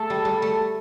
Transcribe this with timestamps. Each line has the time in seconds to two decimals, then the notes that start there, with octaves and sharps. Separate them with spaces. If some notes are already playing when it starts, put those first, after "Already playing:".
Already playing: A3 A4
0.10 G3
0.25 G3
0.42 A3